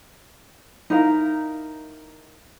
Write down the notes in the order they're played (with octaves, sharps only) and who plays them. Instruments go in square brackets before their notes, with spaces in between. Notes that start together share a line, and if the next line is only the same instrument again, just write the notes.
[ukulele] D#4 E4 A#4 F5